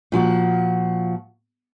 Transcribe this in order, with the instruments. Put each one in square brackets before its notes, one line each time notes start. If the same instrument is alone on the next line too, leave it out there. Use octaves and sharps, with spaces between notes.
[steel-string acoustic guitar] A#2 F3 F#4